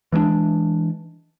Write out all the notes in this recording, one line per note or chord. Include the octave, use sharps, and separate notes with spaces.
E3 G#3 A#3 D4